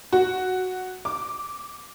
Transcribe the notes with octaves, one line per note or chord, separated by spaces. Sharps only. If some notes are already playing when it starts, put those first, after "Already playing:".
F#4
D6